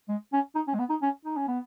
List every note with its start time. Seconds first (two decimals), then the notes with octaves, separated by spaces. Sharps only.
0.09 G#3
0.33 C#4
0.55 D#4
0.67 C#4
0.74 G#3
0.79 B3
0.90 D#4
1.02 C#4
1.25 D#4
1.37 C#4
1.48 B3